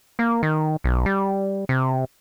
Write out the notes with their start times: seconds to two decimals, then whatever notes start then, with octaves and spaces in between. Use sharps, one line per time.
0.19 A#3
0.43 D#3
0.84 B1
1.06 G3
1.69 C3